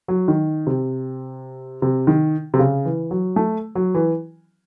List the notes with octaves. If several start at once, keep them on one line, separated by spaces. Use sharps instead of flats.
F#3
D#3
C3
C3
D#3
C3
C#3
E3
F#3
A3
F#3
E3